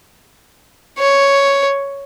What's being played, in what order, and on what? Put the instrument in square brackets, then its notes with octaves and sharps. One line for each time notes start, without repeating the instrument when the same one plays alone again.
[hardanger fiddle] C#5